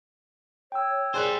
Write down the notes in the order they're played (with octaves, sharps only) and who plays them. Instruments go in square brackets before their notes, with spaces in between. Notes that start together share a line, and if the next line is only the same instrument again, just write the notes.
[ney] C#5 [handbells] G5 E6
[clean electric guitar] G3 C5 [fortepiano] G#4 D5 F#6